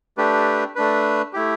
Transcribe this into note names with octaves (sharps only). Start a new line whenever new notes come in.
A3 D4 G4 B4
A3 D4 B4
A3 E4 G4